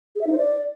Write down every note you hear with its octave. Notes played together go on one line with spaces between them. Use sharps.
G#4
E5
D#4
C5
D5